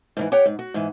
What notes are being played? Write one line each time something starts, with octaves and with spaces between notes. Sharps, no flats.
G#2 D#3 E3
G4 C#5 F#5 G5
G#2
F#4
G#2 E3